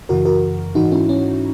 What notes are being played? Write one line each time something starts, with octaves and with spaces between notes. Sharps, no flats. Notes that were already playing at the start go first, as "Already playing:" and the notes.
F#2 C#3 E3 F#4 A#4
F#4 A#4
G#2 E3 D#4 F#4
C#4 E4
C#4